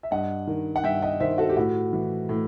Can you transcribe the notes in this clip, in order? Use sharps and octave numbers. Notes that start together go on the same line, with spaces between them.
E5
G2 D#5 F#5
D#3
F#5
G2 E5 G5
D#5 F#5
D#3 C5 E5
F#4 A4
G4
A2 F#4
E3
A2